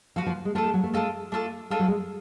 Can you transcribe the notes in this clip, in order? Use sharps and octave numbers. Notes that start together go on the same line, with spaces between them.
F3 F#4 B4 F5
F3
G#3
A3 D4 F4 A4
G#3
F#3
A3
G#3 D4 F4 A4
A3 D4 F4 A4
G#3 D4 F4 A4
F#3
G#3